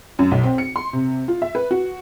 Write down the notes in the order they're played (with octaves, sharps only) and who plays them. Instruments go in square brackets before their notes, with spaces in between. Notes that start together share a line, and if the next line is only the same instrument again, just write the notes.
[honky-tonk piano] F#2
B1
C4
C#7
C6
C3
F4
E5
B4
F#4